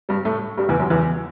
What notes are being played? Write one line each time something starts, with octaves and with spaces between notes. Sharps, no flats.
G2 G3
A2 A3
G2 G3
E2 E3
F#2 F#3
E2 E3